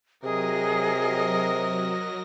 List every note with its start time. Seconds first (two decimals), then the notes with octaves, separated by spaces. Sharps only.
0.24 C3 F#3 G#4 A#4 D#5 A#6